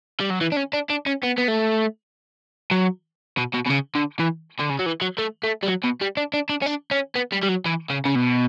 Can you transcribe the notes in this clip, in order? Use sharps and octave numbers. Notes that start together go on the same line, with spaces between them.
G3
F#3
E3
D4
C#4
D4
D4
C#4
B3
B3
A3
F#3
B2
B2
B2
C#3
D3
E3
D3
C#3
F#3
E3
F#3
A3
A3
G3
F#3
B2
G3
D4
D4
D4
C#4
D4
C#4
B3
G3
G3
F#3
E3
C#3
C#3
B2